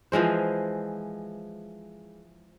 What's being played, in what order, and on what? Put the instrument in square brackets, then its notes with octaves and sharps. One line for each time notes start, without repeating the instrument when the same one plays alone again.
[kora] E3 F3 G#3 C5